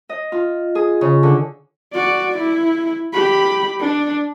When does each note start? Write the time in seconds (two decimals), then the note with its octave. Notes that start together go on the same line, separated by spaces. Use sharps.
0.09 D#5
0.32 F4
0.75 G#4
1.01 C#3
1.23 D3
1.94 F#4 D5
2.38 E4
3.13 G4 B5
3.80 D4